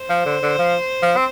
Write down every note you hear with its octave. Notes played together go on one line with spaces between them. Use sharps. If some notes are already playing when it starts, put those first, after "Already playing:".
Already playing: C5
F3
D3
D3
F3
F3
C4